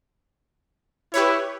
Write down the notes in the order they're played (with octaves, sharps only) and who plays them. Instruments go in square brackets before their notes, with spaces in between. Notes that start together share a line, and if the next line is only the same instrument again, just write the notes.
[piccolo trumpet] E4 [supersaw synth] G4 B4 C#5